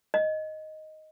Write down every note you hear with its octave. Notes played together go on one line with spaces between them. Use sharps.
D#5